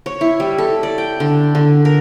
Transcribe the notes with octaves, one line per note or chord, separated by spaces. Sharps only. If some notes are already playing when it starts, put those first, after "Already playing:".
C#5
E4
G3
A4
D5
G5
D3
D3
A#4